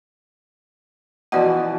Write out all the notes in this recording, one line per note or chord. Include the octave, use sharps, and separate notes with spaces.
B2 E3 F3 F#4 D5 F#5